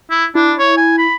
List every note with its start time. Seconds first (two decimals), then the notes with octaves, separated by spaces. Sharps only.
0.10 E4
0.35 D4 E4
0.58 C#5
0.77 G#5
0.98 B5